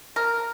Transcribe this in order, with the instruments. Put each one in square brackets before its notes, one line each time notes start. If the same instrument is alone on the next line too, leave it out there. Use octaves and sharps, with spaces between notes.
[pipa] A#4